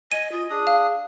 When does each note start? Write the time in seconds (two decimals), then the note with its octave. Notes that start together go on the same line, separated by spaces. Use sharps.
0.12 D#5 G#5 D#7
0.32 F4 D#5
0.50 D4 G#4 D#6
0.67 F5